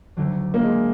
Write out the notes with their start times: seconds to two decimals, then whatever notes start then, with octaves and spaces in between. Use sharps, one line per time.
0.17 D2 D3 F#3
0.54 A#3
0.63 G#3